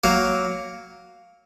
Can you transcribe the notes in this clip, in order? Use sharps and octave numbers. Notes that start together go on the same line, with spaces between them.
F#3 A#3